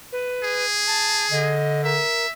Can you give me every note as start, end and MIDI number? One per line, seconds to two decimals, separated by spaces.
0.12 0.66 71
0.43 1.57 68
0.87 1.27 81
1.31 2.01 50
1.31 1.84 75
1.84 2.26 70
1.84 2.33 76